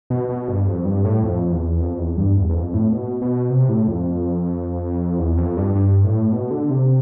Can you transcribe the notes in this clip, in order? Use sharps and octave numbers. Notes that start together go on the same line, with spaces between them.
B2
B2
G2
F2
G2
A2
F2
E2
F2
E2
G2
E2
E2
F2
A2
B2
B2
C3
A2
F2
E2
F2
G2
G2
A2
B2
D3
C3